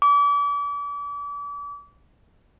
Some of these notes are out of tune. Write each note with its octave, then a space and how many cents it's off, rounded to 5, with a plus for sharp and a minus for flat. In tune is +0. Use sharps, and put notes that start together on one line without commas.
D6 -35